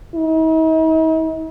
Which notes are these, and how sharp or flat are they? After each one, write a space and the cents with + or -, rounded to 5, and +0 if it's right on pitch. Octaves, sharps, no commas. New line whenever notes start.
D#4 +45